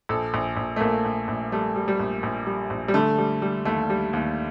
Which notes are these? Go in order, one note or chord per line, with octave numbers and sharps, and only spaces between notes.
A#1 A4
A#1
A#1
A3
A#1 A#3
A#1
A#1
G3 A3
G3
G3
A#1
A#1
G3
A#1
G3
D3 A3
G3
G3
D#2 A3
G3
D#2